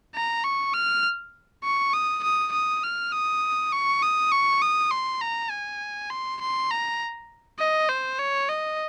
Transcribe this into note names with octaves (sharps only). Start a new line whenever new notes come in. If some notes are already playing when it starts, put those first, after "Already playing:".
A#5
C#6
F6
C#6
D#6
D#6
D#6
F6
D#6
C#6
D#6
C#6
D#6
C6
A#5
G#5
C6
C6
A#5
D#5
C5
C#5
D#5